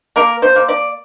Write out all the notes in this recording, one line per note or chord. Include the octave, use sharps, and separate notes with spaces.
A#3 A#4
C5
A#3
D5